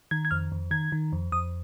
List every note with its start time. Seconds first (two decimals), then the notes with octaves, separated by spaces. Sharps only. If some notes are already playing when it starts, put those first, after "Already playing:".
0.11 D#3 G#6
0.25 G#6
0.31 F2 F6
0.52 F2
0.71 D#3 G#6
0.92 D#3
1.12 F2
1.32 F2 D#6